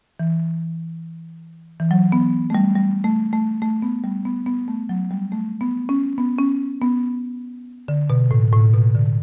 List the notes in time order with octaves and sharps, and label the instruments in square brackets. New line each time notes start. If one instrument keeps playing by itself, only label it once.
[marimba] E3
E3
F#3
B3
A3
G3
G3
A3
A3
A3
B3
G3
B3
B3
A3
F#3
G3
A3
B3
C#4
B3
C#4
B3
D3
B2
A2
A2
B2
D3